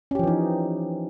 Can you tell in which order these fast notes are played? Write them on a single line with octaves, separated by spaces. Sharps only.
C#4 G4 F3 E3 D#4